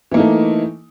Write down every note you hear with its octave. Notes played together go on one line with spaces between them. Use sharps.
E3 A3 A#3 D#4